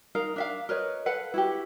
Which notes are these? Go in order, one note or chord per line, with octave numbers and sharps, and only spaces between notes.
D#4 A#4 F5
D4 E5 F5
A#4 B4 C#5 D#5
A4 B4 F5 F#5
E4 F#4 G4